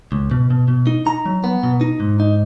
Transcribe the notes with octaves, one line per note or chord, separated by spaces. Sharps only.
C#2
B2
B2
B2
D#4
D#4 A#5
F#3
B3
B2
D#4
G#2
D#4